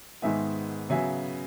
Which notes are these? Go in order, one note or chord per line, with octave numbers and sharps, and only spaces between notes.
G#2 D#3 G#3 B3 E5 G#5
C#3 F#3 B3 E5 G#5